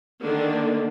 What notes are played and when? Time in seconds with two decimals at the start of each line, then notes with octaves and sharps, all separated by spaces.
0.21 D3 D#3 A#3 D4